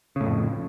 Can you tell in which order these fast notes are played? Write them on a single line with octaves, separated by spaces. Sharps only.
C#3 A2 F2